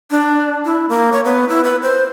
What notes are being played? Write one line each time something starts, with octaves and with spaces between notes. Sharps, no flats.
D4
E4
A#3
C#5
B3
E4
B4
C5